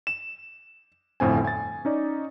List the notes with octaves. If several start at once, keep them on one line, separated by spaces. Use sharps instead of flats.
E7
G1 F2 A2 C4 G#5
G#5 A6
C#4 D#4 D5